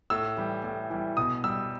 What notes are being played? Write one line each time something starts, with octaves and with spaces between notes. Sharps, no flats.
A2 E6
E3 G3
A2
E3 G3
B2 D#6
G3 E6